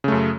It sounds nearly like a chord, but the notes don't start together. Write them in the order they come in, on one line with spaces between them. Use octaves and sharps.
C#3 A3 F#2